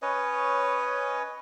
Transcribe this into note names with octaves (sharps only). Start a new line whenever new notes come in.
C#4 B4 C#5 D#5